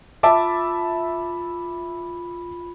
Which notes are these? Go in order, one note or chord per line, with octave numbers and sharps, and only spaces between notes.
F4 E5 A5 B5 D6